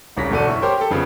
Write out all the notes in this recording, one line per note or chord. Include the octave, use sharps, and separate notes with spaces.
D#1 C2 C#3 A#6 B6
G1 E2 B2 A4 D5 D#7
F#1 E4 C#6
G4 A#4 C5 C#5 C6 D6
G4 A4
F2 C#3 F3 B3 C#4